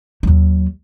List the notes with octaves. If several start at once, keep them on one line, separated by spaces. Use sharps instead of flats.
D#2 F#3